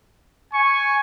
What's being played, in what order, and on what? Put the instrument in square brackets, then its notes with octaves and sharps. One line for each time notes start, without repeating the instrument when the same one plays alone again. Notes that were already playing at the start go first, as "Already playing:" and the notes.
[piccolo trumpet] G#5 [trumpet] C#6